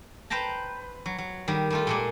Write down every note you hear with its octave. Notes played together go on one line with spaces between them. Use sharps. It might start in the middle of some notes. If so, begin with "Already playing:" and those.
B4 C5 G5 A5 A#5
F#3
F#3
D#3 G3
G3 A3 F4
A#2 G#3 A#3